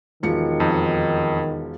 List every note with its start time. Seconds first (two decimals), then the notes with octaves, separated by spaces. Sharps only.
0.23 E1 D#3 F3 C#7
0.60 F2 D#4